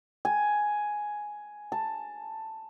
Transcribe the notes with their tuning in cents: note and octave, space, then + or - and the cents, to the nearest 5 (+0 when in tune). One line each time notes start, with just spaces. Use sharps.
G#5 +5
A5 +10